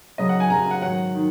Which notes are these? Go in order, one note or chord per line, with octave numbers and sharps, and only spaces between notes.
F#2 C#3 F#3 D#5
F#5
G#5
F#2 C#3 F#3 A#5
F#5
G#2 D#3 F#3 F#5
D#3